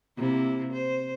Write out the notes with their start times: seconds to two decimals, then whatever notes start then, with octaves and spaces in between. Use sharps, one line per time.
0.17 C3 A#3 E4
0.72 C5